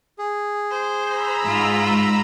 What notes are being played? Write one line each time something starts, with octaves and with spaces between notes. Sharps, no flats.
G#4
C5
A#5 B5 E6
G#2 F4